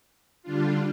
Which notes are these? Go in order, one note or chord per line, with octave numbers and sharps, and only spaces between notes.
D3 G3 D4 F4